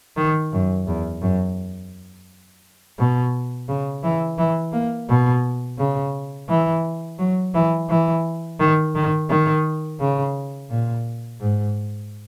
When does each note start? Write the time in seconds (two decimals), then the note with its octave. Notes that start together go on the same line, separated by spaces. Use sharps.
0.17 D#3
0.53 F#2
0.87 E2
1.22 F#2
2.98 B2
3.68 C#3
4.03 E3
4.38 E3
4.73 A#3
5.09 B2
5.78 C#3
6.49 E3
7.19 F#3
7.54 E3
7.89 E3
8.60 D#3
8.95 D#3
9.30 D#3
10.00 C#3
10.70 A#2
11.41 G#2